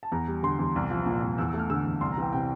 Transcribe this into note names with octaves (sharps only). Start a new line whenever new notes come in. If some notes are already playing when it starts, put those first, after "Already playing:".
A5
E2 A#5
G3
D3 C6
E2
C2
F3
A#2
C2
E2 E6
E6
A3
F6
D3 E6
E2
C2 C6
A#5
E3 G5
C3 G5